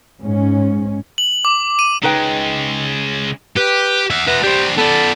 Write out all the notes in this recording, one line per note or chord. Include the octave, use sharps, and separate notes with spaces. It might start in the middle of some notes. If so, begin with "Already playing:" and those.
G#2 C#4
F#7
D6
D#7
C#3 G#3 D#4 B4 G5
G4 B4
E5 F#5
F#4 B4 E5
D4 G4 C5
B3 A4 D5